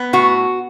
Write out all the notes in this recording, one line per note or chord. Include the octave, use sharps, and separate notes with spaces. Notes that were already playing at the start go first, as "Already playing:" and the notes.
Already playing: B3
A2 F#4